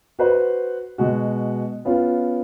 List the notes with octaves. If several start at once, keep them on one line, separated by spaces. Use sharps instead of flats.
F#4 B4 C5
B2 G#3 F#4
B3 C#4 F4